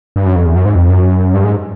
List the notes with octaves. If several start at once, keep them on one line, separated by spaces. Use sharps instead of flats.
G2
F#2
F2
E2
F#2
G#2
F2
F#2
G2
G#2